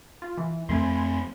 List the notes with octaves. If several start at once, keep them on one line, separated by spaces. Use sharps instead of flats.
F4
E3
F2 A3 C4 G#5 B5 C6